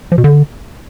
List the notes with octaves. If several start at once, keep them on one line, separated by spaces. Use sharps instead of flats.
F3
B2
D3